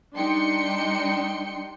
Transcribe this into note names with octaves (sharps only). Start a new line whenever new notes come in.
G3 D4 D#4 G5 C6 C#7